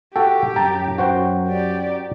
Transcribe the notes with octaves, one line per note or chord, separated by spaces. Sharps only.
F#4 G4 A4 G5
F#2 G5 A5 A#5
F#4 C5 G5
G4 D5